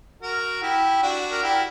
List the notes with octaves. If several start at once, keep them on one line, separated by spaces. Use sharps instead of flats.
F#4 A#4
E4 G4
D4 F#4
A#4
E4 G4